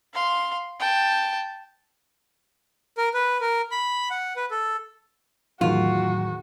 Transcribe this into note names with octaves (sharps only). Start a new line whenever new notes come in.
F5 C6
G5 A5
A#4
B4
A#4
B5
F#5
B4
A4
E2 A2 D#3 F#3 F4 F#4